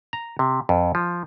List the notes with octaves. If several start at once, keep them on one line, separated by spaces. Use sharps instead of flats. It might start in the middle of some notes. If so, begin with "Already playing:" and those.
A#5
C3
F2
F3